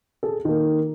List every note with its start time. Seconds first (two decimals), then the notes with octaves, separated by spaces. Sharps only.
0.23 G#4 A4
0.45 D#3 A#3